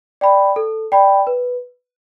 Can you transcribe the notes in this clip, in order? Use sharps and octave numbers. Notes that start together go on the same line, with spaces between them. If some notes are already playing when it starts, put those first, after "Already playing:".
D5 G5 B5
A4
D5 G5 B5
B4